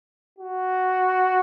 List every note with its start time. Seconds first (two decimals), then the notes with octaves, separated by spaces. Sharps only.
0.39 F#4